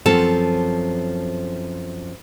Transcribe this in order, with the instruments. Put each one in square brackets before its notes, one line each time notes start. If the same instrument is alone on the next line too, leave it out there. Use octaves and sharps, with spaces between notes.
[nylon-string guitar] F#2 F3 C4 A4 A5